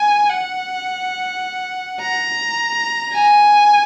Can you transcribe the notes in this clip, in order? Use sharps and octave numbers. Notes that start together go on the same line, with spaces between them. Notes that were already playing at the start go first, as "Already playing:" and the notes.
Already playing: G#5
F#5
A#5
G#5